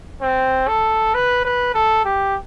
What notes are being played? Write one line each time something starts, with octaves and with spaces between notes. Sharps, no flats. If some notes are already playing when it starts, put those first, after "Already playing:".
C4
A4
B4
B4
A4
G4